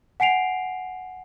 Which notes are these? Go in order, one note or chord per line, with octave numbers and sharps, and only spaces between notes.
F#5 G#5 C7 D7 F7